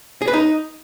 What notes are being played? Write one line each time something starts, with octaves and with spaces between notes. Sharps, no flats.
G#4
B4
D#4